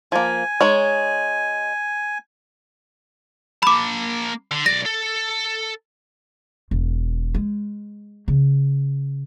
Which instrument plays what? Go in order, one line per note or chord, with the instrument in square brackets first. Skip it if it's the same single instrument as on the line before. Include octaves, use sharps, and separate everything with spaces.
[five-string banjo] F3 A#3 [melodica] G#5
[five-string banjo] G#3 D#4 C#5
[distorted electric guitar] A#3 A5 [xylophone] B5 D6
[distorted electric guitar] D3
[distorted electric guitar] B1 D5 [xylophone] A#6
[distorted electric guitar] A4
[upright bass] E1
G#3
C#3